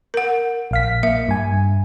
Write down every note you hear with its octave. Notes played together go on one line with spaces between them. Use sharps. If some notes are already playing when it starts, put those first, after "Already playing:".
A#4 F#5
A#1 F5 B6
A#3 E5
G2 G#5